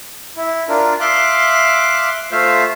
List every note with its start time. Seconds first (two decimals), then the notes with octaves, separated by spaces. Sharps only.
0.36 E4
0.68 D4 F4 A#4
1.00 E5 F5 C6 D6 F#6
2.32 A3 F4 C5 E5 F5